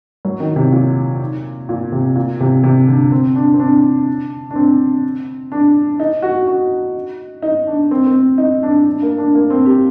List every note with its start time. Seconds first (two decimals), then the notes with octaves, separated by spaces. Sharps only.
0.25 F#3
0.40 D#3
0.56 C3
0.72 A#2
1.69 A#2
1.92 C3
2.16 A#2
2.40 C3
2.63 C3
2.88 D3
3.12 C4
3.35 D4
3.54 C4
3.60 D4
4.51 D4
4.56 C4
5.52 D4
6.00 D#4
6.22 F#4
6.47 F#4
7.42 D#4
7.67 D4
7.91 C4
8.06 C4
8.38 D#4
8.63 D4
8.87 D4
9.02 A#3
9.18 D4
9.35 A#3
9.50 C4
9.66 G4